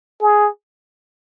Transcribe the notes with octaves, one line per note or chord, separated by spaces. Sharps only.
G#4